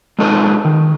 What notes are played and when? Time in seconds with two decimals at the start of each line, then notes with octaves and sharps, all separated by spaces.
0.19 G#3 D4 D#4 A4 B4 D#5
0.65 D#3